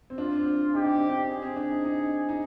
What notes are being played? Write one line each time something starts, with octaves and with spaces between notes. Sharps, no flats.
C4
D4 F4
C4
D4
D#4 G4
D4
C4
D4
G#4
C4
D4
D#4
D#4
D#4